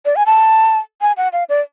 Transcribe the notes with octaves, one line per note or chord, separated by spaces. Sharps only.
D5
G#5
A5
G#5
F#5
F5
D5